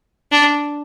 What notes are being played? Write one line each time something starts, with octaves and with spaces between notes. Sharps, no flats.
D4